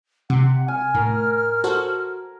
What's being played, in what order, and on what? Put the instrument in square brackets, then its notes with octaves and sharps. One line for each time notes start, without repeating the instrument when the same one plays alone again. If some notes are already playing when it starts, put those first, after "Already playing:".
[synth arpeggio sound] C3 [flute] F#5
[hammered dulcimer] G#5 [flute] F6
[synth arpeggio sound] A2 [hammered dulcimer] A#4
[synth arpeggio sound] F#4 A4 C5